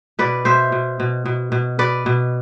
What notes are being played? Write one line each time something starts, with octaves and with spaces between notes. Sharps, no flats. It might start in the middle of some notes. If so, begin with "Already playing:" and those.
B2 B4 D5
B2 C5 E5
B2
B2
B2
B2
B2 B4 D5
B2